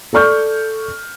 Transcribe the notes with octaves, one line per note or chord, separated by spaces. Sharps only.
A4 D5 C#6 F6 G6